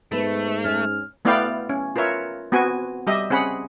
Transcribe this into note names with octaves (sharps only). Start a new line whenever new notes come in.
G#2 A3 B3 B4
C#4 F6
A3 B3 E4 D5 F5 G5
C#4
F4 A#4 B4 C#5 E5
B3 C4 F#4 G#5
G3 G4 D#5 E5
C4 C#4 G#4 F#5 B5